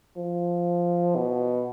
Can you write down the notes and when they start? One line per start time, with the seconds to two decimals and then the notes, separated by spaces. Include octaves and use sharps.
0.17 F3
1.16 B2